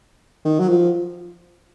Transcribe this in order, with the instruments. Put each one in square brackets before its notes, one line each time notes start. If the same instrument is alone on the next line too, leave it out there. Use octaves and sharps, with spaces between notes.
[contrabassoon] D#3
F#3
F3